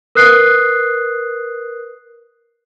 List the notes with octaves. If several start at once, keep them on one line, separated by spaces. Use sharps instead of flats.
A#4 B4 D#6 F#6 C7